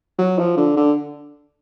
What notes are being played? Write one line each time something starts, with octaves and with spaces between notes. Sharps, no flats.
F#3
F3
D3
D3